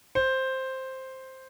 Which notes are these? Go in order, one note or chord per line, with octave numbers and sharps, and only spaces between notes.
C5